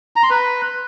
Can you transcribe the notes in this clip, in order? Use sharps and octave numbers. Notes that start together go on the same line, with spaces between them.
A#5
C6
B4